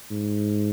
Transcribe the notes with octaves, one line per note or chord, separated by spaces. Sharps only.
G#2